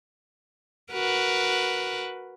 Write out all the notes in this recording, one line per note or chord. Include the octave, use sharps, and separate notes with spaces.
F#4 A#4 B4